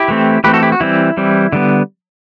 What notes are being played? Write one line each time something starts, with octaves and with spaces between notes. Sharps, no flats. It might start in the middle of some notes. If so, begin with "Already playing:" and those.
Already playing: E4 G4
E3 A3 C4
E3 A3 C4 G4 B4
F#4 A4
E4 G4
F#4
E3 G3 C4 E4
E3 G3 C4
D3 G3 B3